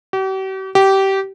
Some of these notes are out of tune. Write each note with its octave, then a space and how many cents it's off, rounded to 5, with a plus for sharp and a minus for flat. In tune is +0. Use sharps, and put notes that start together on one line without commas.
G4 -45
G4 -20